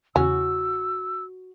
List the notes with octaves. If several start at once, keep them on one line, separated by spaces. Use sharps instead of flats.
E2 C#3 C#4 F#4 E6